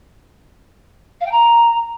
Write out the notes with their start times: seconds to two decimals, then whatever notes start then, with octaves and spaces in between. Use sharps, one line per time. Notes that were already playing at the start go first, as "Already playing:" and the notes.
1.21 F5
1.26 G5
1.32 A#5